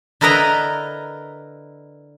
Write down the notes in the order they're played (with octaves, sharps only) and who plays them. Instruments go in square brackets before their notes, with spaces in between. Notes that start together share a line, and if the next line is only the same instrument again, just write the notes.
[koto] D3 E4 A#4 B4 D#5 A#5